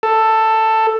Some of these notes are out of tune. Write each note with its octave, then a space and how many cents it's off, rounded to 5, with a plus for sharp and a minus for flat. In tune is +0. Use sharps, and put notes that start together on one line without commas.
A4 +10